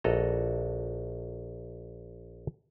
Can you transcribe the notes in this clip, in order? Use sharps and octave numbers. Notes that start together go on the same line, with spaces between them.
A#1 F#4 A4 D#5 A#5